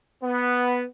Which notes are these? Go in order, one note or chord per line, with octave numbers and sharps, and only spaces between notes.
B3